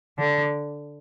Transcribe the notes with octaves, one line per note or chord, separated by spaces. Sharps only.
D3